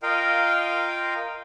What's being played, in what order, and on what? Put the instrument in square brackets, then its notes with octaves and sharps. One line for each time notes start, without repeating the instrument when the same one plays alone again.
[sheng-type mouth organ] F4 A#4 D#5 F5 G5